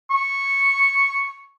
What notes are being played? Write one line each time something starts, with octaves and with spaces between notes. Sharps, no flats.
C#6